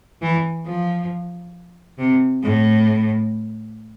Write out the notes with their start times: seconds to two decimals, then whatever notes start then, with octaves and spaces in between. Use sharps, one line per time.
0.22 E3
0.66 F3
1.98 C3
2.43 A2